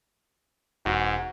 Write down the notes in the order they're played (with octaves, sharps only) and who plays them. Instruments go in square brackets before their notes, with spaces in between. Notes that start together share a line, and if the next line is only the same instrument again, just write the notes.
[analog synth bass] E1 [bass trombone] G#2 [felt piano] F#4